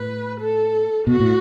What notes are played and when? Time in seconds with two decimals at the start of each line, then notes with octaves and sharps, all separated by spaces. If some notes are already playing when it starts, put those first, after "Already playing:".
Already playing: A2 B4
0.40 A4
1.07 B2 F#4
1.20 A2